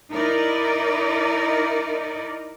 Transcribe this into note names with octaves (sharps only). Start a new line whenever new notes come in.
D#4 E4 A#4 D5 D#5